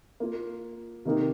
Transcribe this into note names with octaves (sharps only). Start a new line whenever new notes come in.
A#3 F4 A#4
C3 D#3 A#3 D#4 A#4